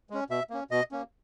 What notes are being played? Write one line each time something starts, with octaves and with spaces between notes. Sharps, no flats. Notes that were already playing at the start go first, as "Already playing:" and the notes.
G#3 C#4
B2 E5
A#3 C#4
B2 D#5
A#3 C#4